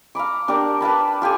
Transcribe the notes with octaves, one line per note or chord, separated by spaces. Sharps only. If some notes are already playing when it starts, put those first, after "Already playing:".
F5 A#5 B5 D6
D4 G4 A#4 D6
B4 F5 A5 B5
F4 G4 A4 G#5